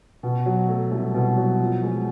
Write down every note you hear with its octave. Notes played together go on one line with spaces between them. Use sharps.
B2
F#3
A3
C2
B2
F#3
F3
G#3